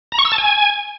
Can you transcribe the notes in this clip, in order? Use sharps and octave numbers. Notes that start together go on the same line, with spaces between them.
A#5
C#6
E6
A5
G#5